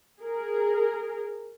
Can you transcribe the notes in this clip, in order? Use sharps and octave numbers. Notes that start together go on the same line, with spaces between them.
G#4 A#4